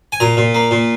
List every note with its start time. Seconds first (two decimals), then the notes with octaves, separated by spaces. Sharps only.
0.12 G#5
0.20 A#2 A#5
0.37 A#2
0.54 A#3
0.71 A#2